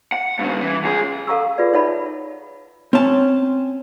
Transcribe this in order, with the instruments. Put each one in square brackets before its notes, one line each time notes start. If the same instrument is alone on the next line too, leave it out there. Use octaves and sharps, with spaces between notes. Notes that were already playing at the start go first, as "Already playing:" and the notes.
[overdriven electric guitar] F#5
G2 C#3
E3
C#2 G#4
[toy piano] A4 F5 F#5 A#5 C#6 E6
F4 G#4 B4 D5
D#4 C#5 E5 F#5 A5 B5
[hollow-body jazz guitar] C4 A5 [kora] C#4